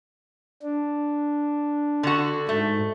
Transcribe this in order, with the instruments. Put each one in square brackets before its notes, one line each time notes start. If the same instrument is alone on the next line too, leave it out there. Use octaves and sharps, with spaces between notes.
[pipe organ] D4
[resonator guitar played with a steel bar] D3 F#4
[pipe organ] G#2 [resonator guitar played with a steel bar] A3